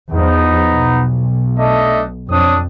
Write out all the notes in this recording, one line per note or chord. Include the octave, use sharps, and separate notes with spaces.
E2 F3 B3 D#4
B1
A3 D4 D#5
F2 D4 C#5 D#6